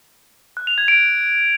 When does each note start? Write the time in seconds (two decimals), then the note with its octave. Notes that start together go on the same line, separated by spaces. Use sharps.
0.57 F#6
0.67 F7
0.78 G#6
0.88 D7